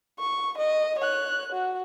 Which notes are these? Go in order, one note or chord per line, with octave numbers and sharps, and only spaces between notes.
C#6
D#5
C#5 F#6
F#4